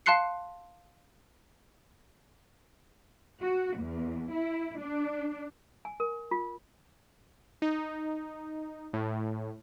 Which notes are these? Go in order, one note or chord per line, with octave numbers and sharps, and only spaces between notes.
F5 A5 C6 F#6 C7 C#7
F#4
E2
E4
D4
G#5
A#4
F4
D#4
A2